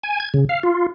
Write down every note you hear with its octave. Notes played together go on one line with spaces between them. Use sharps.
G#5
G#6
C#3
F5
F4